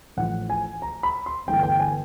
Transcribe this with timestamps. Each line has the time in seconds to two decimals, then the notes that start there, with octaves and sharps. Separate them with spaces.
0.17 A1 A2 F3 F#5
0.50 G#5
0.82 A#5
1.03 B5
1.26 C6
1.47 G1 G2 E3 A3 G5
1.63 G5
1.80 G#5